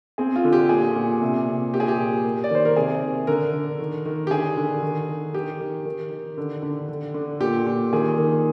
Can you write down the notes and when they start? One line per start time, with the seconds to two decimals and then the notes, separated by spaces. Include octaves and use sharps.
0.18 C4 G#4
0.36 F4
0.44 D3
0.53 G4
0.69 A#2 G#4
0.96 A#2
1.22 C3
1.48 C3
1.73 A#2 G4
1.80 G#4
1.88 G4
1.98 A#2
2.25 A#3
2.44 D5
2.51 D#3 C5
2.65 A#4
2.76 C3 G#4
3.02 C3
3.27 D3 A#4
3.53 D3
3.80 D#3
4.06 D#3
4.27 G4
4.31 D3 G#4
4.57 D3
4.82 D#3
5.09 D#3
5.34 D#3 G4
5.61 D#3
5.85 D#3
6.11 D#3
6.38 D3
6.63 D3
6.89 D3
7.14 D3
7.40 A#2 G4
7.67 A#2
7.93 D#3 G#4
8.18 D#3